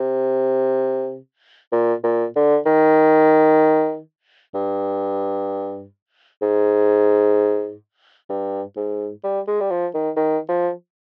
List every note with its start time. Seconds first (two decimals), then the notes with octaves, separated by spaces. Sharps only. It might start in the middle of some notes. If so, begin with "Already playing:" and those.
Already playing: C3
1.72 A#2
2.03 A#2
2.36 D3
2.66 D#3
4.54 G2
6.42 G#2
8.29 G2
8.76 G#2
9.24 G3
9.47 G#3
9.60 G3
9.71 F3
9.94 D#3
10.16 D#3
10.49 F3